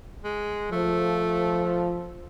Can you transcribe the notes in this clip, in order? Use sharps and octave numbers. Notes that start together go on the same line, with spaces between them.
G#3
F3 A3